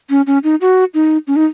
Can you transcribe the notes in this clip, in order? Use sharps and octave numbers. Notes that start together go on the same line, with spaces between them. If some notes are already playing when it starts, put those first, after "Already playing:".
C#4
C#4
D#4
F#4
D#4
C#4
D#4